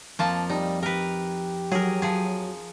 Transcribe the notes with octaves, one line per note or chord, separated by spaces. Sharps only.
F2 F3 A#3 A5
G3 D#4
G4 A#4 B4
F#3 G#4 A#4
F3 G#4